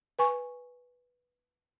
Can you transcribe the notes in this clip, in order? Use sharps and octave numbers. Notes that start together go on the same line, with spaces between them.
B4 G#5 C#6